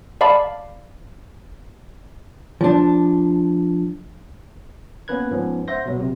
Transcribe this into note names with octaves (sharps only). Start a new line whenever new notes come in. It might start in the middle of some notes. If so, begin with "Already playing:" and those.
D5 F5 A5 B5 D6
F3 D4
A#3 B3 C#4 B4 F#6 G#6
G#2 F3 B3 C#4
C5 E5 F#5 C6 G6 A#6
B2 F#3 B3
C3